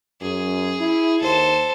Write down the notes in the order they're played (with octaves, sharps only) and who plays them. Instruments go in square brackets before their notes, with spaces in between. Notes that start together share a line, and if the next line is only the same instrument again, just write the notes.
[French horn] F#2 [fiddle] G#4
[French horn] E4
[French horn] D#2 [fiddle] A4 C5